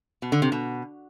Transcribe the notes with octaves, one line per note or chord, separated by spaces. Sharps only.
B2
D3
C3
B2